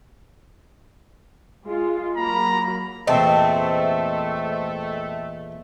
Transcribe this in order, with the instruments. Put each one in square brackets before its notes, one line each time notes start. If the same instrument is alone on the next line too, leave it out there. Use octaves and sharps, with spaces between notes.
[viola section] G#3 F4
[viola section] F#3 A#3 B5 [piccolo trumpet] A#5
[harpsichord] E2 A#2 [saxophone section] A3 [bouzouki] C4 [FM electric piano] D#5 A5